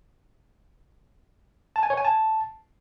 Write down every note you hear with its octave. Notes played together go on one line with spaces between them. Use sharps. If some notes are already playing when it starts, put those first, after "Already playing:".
A5
G#5
C#5
G#5
A5